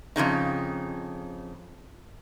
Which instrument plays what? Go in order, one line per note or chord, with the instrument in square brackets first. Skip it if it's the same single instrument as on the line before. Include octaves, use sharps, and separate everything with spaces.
[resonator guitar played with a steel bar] F2 G#2 C#3 D#4